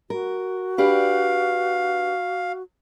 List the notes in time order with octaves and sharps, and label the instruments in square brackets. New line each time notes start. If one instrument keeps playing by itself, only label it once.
[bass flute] F#4 [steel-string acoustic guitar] A#4
[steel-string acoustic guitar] D4 G4 B4 [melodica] F5